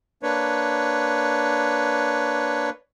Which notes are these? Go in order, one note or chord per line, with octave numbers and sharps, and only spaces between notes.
A#3 D4 B4 C#5